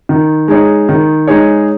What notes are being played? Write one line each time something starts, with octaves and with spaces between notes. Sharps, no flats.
D#3
G#3 D#4 G#4 C#5
D#3
G#3 D#4 G#4 C#5